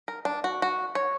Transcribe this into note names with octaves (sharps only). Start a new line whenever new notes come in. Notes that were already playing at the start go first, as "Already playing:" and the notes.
A#4
D4
F#4
F#4
C#5